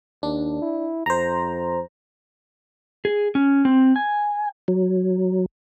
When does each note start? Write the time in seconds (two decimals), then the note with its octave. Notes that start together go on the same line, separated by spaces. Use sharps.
0.23 D#2 D4
0.62 E4
1.06 F2 C5 A#5
3.05 G#4
3.35 C#4
3.65 C4
3.96 G#5
4.68 F#3